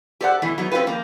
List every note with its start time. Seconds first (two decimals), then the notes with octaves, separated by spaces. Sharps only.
0.21 G4 A4 C5 D5 F#5
0.42 B2 E3 A3
0.58 F#3 B3 D#4
0.72 C4 C#4 D#4 F4 G4 B4
0.87 F3 A#3